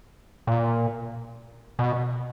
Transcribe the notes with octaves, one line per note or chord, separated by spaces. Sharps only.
A#2
B2